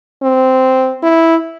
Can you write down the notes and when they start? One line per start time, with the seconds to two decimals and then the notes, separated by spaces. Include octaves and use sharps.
0.23 C4
1.03 E4